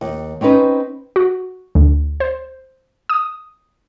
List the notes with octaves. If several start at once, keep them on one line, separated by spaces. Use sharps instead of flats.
D#2
C4 C#4 D#4 B4 C5
F#4
D2
C5
D#6